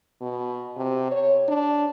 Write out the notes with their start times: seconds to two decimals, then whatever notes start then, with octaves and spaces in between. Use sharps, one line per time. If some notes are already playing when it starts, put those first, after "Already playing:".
0.21 B2
0.77 C3
1.11 C#5
1.48 D4